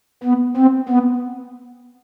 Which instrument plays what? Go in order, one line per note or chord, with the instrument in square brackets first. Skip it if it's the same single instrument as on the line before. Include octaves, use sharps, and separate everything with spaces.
[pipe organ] B3
C4
B3